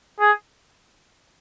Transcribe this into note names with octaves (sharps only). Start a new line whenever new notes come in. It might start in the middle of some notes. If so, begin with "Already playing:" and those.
G#4